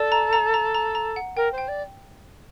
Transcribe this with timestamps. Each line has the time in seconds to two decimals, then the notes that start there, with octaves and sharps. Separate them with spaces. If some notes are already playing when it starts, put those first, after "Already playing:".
Already playing: A4 D5
0.12 A#5
0.33 A#5
0.54 A#5
0.74 A#5
0.95 A#5
1.16 F#5
1.36 A#4 G5
1.52 C5
1.58 G5
1.68 D5